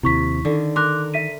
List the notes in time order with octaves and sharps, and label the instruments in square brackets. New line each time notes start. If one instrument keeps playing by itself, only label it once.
[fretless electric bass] D#2 C3 [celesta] E4 C#6 B6
[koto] D3 [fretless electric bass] D#3
[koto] A#4 [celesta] C6 D6 F#6
[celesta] E5 B6 D#7